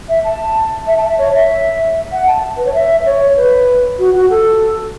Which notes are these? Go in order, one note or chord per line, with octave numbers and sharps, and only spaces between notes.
E5
A5
E5
A5
E5
C#5
E5
F#5
A5
B4
C#5
E5
C#5
B4
F#4
F#4
A4